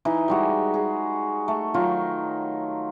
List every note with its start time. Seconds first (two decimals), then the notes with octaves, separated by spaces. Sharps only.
0.05 E3 D#4 B4
0.28 G3 G#3 F#4
0.74 G#4
1.48 A3
1.74 D#3 F#3 F4